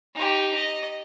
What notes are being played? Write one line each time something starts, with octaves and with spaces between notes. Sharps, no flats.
D#4 G4
D#5